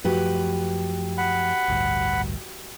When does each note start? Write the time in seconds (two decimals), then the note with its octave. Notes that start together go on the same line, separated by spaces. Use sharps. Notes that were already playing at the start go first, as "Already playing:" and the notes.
0.04 F#2 F3 A3 F#4 G4 B4
1.18 F#5 B5
1.68 A1 D2 G2